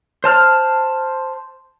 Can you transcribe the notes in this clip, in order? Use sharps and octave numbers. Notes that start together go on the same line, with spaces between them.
C5 A5 F6